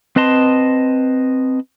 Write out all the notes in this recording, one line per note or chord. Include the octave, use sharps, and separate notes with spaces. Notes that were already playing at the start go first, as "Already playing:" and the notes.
C4 B4 D#5 A5 C6